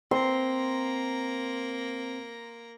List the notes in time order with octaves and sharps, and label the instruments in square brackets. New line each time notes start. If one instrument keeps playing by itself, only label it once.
[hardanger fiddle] A#3 A#5 [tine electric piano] C4 [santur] C6